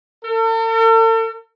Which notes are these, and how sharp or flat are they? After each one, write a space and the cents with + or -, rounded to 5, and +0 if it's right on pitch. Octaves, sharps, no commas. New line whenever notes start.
A4 +45